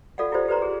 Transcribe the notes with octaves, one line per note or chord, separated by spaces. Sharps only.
F4 A4 D5 F5 F#5
E4 F4 G4 C5 D5
G4 B4 C5 D5 A#5 C6
G#4